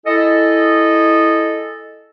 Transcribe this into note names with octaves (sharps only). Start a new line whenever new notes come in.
E4 G#4 A4 D#5